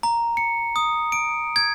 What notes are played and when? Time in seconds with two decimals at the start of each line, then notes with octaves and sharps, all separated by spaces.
0.03 A#5
0.37 C#7
0.76 D#6
1.12 D7
1.56 G#6